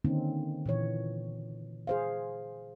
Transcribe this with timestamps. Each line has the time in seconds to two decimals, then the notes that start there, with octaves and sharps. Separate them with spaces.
0.05 D3 D#3 A#3 C4 C#4 D#4
0.66 A#2 E3 C#5
1.87 G#4 C5 F5